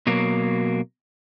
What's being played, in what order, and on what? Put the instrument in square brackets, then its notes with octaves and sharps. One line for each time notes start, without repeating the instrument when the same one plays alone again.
[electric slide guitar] B2 F#3 A#3